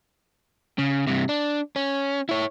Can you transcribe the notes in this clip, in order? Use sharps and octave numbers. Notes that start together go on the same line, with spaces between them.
C#3
G2 C3
D4
C#4
E4 C#5